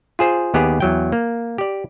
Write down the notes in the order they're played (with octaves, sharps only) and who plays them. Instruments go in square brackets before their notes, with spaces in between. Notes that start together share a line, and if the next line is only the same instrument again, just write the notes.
[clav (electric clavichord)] F4 G#4 C5
D#2 B3 G4 G#4
E2 F#3 G5
A#3
G4 D5